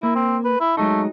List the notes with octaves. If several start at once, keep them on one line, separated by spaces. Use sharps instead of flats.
A#3 E4
C4
B4
E4
F#3 G#3 A3 D#4